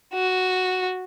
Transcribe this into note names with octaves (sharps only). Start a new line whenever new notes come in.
F#4